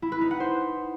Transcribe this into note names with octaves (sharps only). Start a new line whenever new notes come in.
E4
B4
D#4
F#5
C5